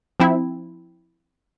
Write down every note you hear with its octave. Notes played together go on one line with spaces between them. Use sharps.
F3 C4 E4